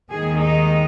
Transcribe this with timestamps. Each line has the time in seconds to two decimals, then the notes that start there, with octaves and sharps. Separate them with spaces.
0.11 D#2 D#3 G#3 G#4
0.40 D#4